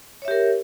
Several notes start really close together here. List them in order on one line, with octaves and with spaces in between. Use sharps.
C#5 E5 G4 A#4